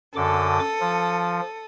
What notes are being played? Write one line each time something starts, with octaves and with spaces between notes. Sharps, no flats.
F#2 D3 A4 D6 D#6
F3